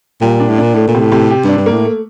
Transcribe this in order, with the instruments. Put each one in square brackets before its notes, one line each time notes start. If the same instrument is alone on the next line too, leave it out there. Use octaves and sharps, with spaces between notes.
[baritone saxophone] A#2 [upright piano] G3
[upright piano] D4
[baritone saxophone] A2
[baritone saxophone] A#2 [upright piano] D4
[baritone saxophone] A2 [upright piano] A3
[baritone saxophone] A#2
[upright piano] C3
[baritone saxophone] A2
[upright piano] C3
G4
[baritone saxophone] G2
[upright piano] D4
[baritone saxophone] G2
[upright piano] A#3
[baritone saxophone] A2
[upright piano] A3